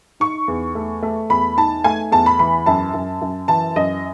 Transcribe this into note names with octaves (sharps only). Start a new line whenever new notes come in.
D#4 C#6
E2
A3
A3
E2 B5
D#4 A5
A3 G#5
E2 A5
B5
E3 B5
F#2 A5
F#2
F#2
E3 A5
F#2 D#5